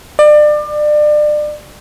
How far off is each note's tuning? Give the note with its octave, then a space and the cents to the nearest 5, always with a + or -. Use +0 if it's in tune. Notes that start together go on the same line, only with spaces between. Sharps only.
D5 +30